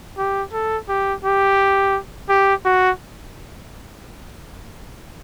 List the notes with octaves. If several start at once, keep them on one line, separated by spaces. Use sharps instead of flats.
G4
A4
G4
G4
G4
F#4